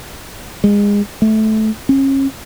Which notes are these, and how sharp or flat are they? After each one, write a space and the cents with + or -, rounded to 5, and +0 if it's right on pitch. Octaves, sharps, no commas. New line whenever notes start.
G#3 -25
A3 -15
C#4 -35